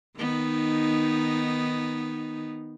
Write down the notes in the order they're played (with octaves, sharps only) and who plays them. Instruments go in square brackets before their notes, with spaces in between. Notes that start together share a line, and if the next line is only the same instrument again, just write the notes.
[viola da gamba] D#3 B3 D#4